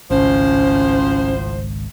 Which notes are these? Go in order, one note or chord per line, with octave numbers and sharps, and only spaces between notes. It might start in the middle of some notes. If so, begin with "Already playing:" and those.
G#1 C#2 A2 F3 C#4 C5